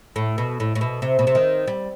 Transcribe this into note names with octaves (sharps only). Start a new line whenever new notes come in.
A2
B2
A2
A2
B2
C3
B2
C3
D#3
G3